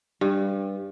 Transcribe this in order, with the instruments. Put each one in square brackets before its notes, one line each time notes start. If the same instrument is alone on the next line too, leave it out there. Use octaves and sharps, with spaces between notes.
[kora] G2